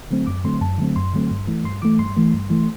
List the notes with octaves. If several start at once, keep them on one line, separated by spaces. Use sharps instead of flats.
D3 F#3 A3 C4
F#2 D6
D3 F#3 A3 C4 C6
F#2 A5
D3 F#3 A3 C4
F#2 C6
D3 F#3 A3 C4
G2
E3 A3
G2 C6
E3 A3 D6
G2 C6
E3 A3
G2
E3 A3